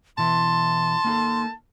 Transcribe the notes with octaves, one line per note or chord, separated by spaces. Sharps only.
B2 E3 E4 A5 C6
A#3 D#4 A4